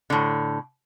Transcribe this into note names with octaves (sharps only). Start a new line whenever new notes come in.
A2 D3